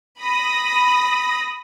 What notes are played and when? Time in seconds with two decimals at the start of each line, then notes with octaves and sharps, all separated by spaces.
0.19 B5 D#6 A#6